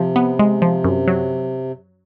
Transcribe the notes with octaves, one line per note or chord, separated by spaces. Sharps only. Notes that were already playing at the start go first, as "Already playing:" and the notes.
Already playing: C3 F3
B3
G#3
F3
F#2
F#3